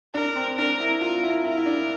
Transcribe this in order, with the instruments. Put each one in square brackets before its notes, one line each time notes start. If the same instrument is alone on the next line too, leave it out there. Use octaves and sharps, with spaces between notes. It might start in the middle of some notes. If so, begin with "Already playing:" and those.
[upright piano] D4 [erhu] A#4
[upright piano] C4
[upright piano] D4 [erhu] A#4
[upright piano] E4
[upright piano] F4 [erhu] A#4
[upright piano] E4
[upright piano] E4 [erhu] A#4
[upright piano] E4
D4